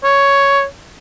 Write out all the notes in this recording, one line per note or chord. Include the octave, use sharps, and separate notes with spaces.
C#5